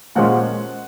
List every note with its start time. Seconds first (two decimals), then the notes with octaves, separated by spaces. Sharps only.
0.15 A#2 F3 G#3 C#4 F#5